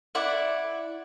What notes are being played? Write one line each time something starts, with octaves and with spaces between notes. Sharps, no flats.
E4 D5 F#5